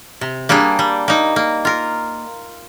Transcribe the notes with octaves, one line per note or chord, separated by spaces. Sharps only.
C3
G3 A#3 D4 G#4
G3
A#3 D#4
A#3
F4 A#4